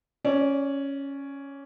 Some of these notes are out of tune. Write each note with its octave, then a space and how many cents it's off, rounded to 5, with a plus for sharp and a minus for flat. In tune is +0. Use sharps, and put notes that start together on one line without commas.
C#4 +0 D5 -20